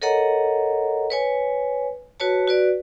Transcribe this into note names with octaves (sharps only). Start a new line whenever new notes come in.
A4 A#4 C#5 D#5 F#5 A#5
B4 C#5 G#5
F#4 B4 C#5 A5
F#4 B4 D5